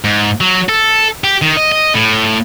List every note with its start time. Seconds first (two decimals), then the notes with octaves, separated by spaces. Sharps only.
0.04 G#2
0.41 F#3
0.69 A4
1.24 G4
1.42 D#3
1.57 D#5
1.72 D#5
1.95 A2